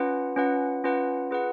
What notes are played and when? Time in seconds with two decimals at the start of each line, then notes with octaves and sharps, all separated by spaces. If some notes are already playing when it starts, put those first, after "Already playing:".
Already playing: C#4 F4 B4 F#5
0.36 C#4 F4 B4 F#5
0.84 C#4 F4 B4 F#5
1.31 F4 G#4 B4 F#5